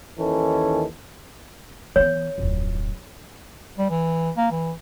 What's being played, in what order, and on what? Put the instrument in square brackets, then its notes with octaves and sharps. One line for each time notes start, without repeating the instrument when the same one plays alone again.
[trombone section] D#2 D#3 E3 C#4 A4
[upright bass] E3 B3 [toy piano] C#5
[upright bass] D1 F2
[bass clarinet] G3
E3
A#3
E3